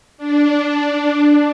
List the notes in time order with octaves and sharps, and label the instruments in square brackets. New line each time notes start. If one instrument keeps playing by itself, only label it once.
[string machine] D4